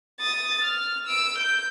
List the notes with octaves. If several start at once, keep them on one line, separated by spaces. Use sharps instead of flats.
D#6 A6
F6
E6 D7
G6